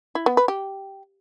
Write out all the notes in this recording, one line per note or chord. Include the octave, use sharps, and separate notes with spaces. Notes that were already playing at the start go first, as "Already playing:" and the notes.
E4
B3
B4
G4